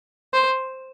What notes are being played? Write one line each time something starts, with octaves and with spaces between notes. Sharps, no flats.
C5